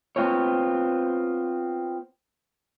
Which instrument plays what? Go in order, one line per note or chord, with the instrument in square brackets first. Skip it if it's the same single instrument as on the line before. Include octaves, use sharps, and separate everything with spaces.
[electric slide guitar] B3 C4 F4 C#5